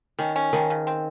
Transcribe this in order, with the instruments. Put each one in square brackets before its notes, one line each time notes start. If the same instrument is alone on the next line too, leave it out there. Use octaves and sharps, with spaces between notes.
[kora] D#3 [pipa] C#4
[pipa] C#4
[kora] D#3 [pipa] F3
[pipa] C#3
C4